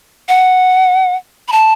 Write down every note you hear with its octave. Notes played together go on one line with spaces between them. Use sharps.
F#5
B5
A5